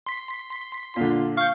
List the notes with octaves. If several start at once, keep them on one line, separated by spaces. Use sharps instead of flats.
C6 B6
A#2 D3 F4
F5 C#6 G6